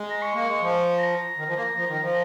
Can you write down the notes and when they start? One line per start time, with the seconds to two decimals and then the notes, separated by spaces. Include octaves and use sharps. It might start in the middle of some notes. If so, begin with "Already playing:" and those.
Already playing: G#3
0.11 A#5
0.22 C#6
0.34 A#3
0.48 G#3
0.61 F3
0.99 A#5
1.37 D#3
1.47 F3
1.56 A#3
1.76 F3
1.88 D#3
2.01 F3